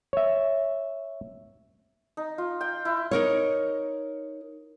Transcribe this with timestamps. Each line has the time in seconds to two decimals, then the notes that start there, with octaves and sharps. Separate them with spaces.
0.13 C#5 E5
2.17 D#4
2.38 F4
2.61 G5
2.85 E4
3.11 D#4 A#4 C#5